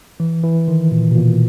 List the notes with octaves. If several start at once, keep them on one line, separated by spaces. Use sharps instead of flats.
E3
E3
D#3
A#2
B2
A#2